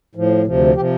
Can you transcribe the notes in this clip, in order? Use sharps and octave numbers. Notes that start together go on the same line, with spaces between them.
A2 F3
D2 C3 F3
C3 F3 G4